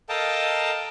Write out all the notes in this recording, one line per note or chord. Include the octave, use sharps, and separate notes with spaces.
A4 A#4 D#5 F5 G5 A5